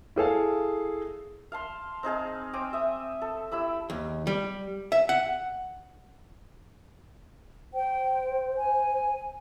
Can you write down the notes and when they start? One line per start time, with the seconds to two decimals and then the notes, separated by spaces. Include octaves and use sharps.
0.16 E4 G#4 A4 F5
1.52 F5 A5 C6
2.03 C4 D#4 G#4 F5
2.53 C4 G5 G#5 D6
2.73 E5 D#6
3.22 A4
3.51 E4 G4 B5 E6
3.90 D#2
4.27 G3
4.92 E5
5.09 F#5
7.74 C5 G5
8.57 G#5